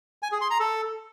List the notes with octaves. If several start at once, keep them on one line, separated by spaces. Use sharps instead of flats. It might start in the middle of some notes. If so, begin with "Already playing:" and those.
G#5
G#4
C6
A#5
A4